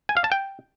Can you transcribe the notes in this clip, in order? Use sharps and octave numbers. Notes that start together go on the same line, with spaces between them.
G#5
F5
A5
G5